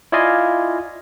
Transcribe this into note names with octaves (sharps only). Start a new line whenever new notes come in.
E4 F4 D5 D#5 F5 G#5